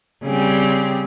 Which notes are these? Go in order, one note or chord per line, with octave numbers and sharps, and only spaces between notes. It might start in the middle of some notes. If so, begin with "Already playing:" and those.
C#3 G3 C4